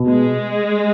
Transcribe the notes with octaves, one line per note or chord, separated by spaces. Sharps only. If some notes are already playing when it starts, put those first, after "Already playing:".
Already playing: B2
G#3